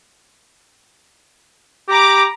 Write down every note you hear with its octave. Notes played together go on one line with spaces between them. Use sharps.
G4 A#5 B5 D6